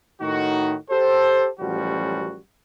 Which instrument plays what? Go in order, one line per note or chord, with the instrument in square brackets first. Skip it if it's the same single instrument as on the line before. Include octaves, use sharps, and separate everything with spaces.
[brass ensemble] A2 D#3 D#4 F#4
G4 A4 C5
A1 F#2 F3 G3 F#4